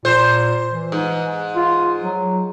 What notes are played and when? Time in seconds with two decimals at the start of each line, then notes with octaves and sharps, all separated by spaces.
0.05 A#2 C5
0.71 E3
0.92 G#2
1.56 F4
2.04 F#3